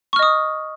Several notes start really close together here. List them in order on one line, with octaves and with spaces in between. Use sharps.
C#6 F6 D#5 D#6